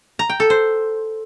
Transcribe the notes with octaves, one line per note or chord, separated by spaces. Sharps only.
A#5
G5
A4
C5